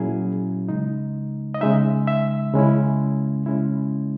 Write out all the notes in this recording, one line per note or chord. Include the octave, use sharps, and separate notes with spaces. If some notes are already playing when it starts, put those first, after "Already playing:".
Already playing: A#2 F#3 C#4 E4 G#4
C#3 G#3 D#4
D#5
C#3 G#3 D#4 E5
E5
C#3 G#3 C#4 E4
C#3 G#3 C#4 E4